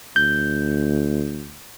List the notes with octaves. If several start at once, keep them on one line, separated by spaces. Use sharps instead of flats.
D2 G6